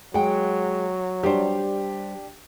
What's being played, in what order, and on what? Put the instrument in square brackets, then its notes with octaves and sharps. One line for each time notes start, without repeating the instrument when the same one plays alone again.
[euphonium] F#3 [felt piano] G#3 [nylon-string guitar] F#5 G5
[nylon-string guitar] G3 C5 [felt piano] D4 G4